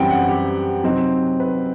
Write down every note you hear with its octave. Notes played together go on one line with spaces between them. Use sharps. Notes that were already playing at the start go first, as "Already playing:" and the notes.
Already playing: F#2 E3 G3 C4 F#5 G5
F#5
G4
C3 F#3 C4 D#4
B4